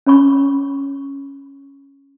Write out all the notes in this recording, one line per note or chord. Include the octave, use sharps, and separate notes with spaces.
C#4 C#5 B5 C#6